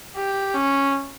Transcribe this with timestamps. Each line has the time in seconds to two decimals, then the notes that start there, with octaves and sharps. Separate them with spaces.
0.16 G4
0.55 C#4